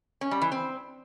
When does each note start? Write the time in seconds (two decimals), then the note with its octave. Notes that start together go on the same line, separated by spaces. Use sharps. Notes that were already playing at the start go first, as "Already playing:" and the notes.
0.21 C#4
0.31 G3
0.41 E3
0.52 C4